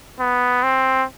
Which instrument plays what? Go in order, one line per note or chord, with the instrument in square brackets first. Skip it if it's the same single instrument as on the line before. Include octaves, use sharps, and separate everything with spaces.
[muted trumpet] B3
C4